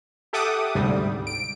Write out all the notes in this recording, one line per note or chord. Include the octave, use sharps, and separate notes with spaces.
G4 A4 E5 F#5 D6 D#6
D2 G#2 C3 G3
D7